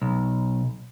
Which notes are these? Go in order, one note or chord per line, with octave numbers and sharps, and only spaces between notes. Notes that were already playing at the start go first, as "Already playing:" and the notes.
B1